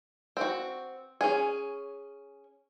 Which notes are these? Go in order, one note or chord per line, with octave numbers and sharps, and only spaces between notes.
C4 F#4
C#4 G#4